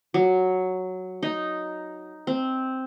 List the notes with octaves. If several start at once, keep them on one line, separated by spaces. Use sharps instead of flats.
F#3
D#4
C4